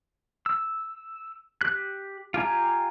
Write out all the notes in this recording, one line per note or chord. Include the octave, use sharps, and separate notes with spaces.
E6
G4 F#6
F4 G4 G#5 A#5